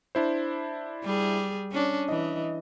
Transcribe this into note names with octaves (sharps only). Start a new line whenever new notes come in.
D4 E4 C5
G3 G#4
C#4 D4
E3 D#5